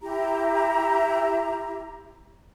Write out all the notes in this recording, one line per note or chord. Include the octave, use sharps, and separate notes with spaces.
E4 G4 A#5